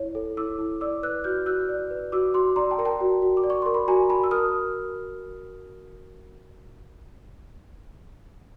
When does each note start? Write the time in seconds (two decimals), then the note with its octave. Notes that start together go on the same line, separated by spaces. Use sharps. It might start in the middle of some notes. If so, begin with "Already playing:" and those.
Already playing: E4 C#5
0.15 A4
0.37 E4 D6 E6
0.59 E4
0.81 D5 D6 E6
1.03 B4 E6 F#6
1.24 F#4 F6 G6
1.46 F#4 E6 F#6
1.69 D5
1.91 B4
2.12 F#4 D6 E6
2.34 F#4 C6 D6
2.56 D5 A#5 C6
2.71 G5 A5
2.78 A#4 A#5
2.85 G5 A5
3.01 F#4
3.22 F#4
3.37 D6
3.44 D5
3.50 C#6
3.62 A#4 C6
3.74 B5
3.88 F#4 G#5 A#5
4.10 F#4 A5 B5
4.24 E6
4.31 A#4 D#6 F6